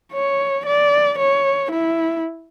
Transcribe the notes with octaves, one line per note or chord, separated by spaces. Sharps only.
C#5
D5
C#5
E4